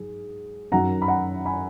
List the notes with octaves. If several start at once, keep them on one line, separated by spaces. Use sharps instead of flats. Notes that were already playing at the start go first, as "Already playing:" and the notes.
Already playing: G#2 F#3 G#4
F#2 D#3 F#3 F#5 A#5
B5
F#5 A#5
G#5 B5